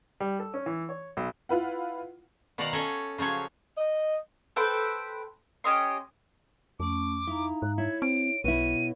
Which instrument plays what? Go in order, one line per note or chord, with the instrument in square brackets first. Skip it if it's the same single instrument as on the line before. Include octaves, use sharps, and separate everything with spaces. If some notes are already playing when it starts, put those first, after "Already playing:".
[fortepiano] G3
A4
C#4
E3
C#5
B1
[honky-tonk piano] E4 F4 B4 F#5
[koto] B2 D#3 D5 F5 F#5 A#5
C#4 A4 C#5 D#5
C#3 F3 F#3 C#5
[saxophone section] D#5
[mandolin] A4 B4 C5 G5
C#4 G4 D#5 C6
[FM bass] F2 [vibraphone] A3 C#4 [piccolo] D6
[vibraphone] D#4 F5 A#5 [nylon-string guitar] E4
[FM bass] G#2 [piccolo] F#6
[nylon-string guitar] E4 [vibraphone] C#5 [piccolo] G#6
[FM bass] C4 [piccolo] D7
[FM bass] B1 [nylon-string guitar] B2 E4 [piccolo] D#7